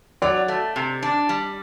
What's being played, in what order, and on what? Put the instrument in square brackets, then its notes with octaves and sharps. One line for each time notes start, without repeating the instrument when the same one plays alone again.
[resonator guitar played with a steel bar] F#3 [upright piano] D5
[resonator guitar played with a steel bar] A3
C3
D4
G3